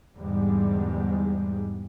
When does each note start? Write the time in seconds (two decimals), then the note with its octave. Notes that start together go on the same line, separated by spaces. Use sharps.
0.16 E2 G#2 D3 G3 G#3